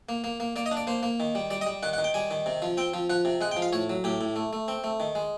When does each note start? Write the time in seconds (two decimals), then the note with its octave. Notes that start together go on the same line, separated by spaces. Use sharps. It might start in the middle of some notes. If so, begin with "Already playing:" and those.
0.09 A#3
0.24 A#3
0.40 A#3
0.56 A#3 D5
0.66 D#5
0.71 D4
0.77 D5
0.87 A#3 C5
1.03 A#3
1.20 D#3
1.35 G3
1.50 G3 D5
1.61 D#5
1.67 G3
1.83 D#3 F#5
1.93 F#5
1.98 D#3
2.04 G5
2.14 G3 G#5
2.31 D#3
2.46 C3
2.62 F3
2.77 C4 G5
2.94 F3
3.10 F3 F#5
3.25 C3
3.41 G#3 F#5
3.51 G5
3.57 F3
3.62 F5
3.73 A2 C#5
3.90 F#3
4.04 A2 G4
4.21 A2
4.36 A3
4.53 A3
4.68 C4
4.84 A3
5.00 D#3
5.15 G#3